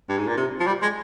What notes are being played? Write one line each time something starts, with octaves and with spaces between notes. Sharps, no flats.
G2
G#2
A#2
C3
F3
G3
G#3